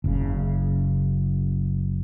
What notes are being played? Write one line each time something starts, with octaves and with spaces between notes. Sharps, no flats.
F#1 C#3